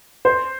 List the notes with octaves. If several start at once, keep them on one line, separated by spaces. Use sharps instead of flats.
C5